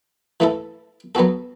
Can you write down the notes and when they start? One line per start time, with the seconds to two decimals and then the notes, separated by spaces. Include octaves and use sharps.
0.40 E3 A3 E4 A4
1.15 F#3 B3 F#4 A4